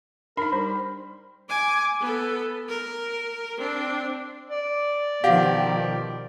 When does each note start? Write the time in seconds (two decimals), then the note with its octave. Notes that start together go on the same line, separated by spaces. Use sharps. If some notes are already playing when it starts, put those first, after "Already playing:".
0.37 D4 D#4 A#4 B5
0.53 G3 C5
1.49 G#5 D6
2.01 B3 A4
2.69 A#4
3.58 C4 D4
4.50 D5
5.24 B2 D#3 F3 G4 F5 F#5